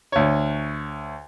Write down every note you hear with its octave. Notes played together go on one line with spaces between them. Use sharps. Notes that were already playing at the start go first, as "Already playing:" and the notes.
D2 C#5